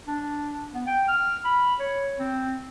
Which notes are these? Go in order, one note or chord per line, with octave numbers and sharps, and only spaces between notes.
D4
B3
G5
F6
B5
C#5
C4